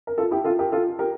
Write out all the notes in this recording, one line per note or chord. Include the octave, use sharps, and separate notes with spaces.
A#4
F4 A4
E4 G4
F4 A4
G4 A#4
F4 A4
G4 A#4